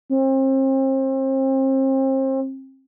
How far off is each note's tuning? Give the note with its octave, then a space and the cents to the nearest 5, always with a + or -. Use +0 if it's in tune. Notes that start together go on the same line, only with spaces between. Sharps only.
C4 +35